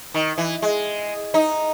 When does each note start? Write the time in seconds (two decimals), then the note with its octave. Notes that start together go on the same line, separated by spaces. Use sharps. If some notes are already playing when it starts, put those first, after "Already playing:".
0.14 D#3
0.38 E3
0.62 G#3
1.34 D#4